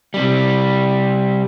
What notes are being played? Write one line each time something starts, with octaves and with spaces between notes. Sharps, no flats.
C3 G3